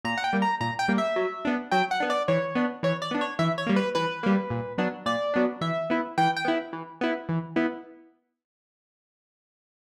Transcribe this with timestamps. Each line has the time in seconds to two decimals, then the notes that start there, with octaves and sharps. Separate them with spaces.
0.05 A#2 A#5
0.18 F#5
0.24 G5
0.33 G3 A#3
0.42 A#5
0.61 A#2 A#5
0.79 G5
0.88 G3 A#3
0.98 E5
1.16 F#3
1.45 B3 D4
1.71 F#3 G5
1.91 F#5
2.00 B3 D4
2.10 D5
2.28 E3 C#5
2.55 B3 D4
2.83 E3 C#5
3.02 D5
3.11 B3 D4
3.21 C#5
3.39 E3 E5
3.58 C#5
3.67 G3 A#3
3.76 B4
3.95 E3 B4
4.23 G3 A#3
4.50 A#2
4.78 F#3 B3 D4
5.06 A#2 D5
5.34 F#3 B3 D4
5.61 E3 E5
5.90 B3 E4
6.18 E3 G5
6.37 G5
6.45 B3 E4
6.73 E3
7.01 B3 E4
7.29 E3
7.56 B3 E4